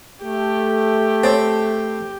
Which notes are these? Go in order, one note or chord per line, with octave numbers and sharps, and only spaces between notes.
A3 G4
C4 C5 C#5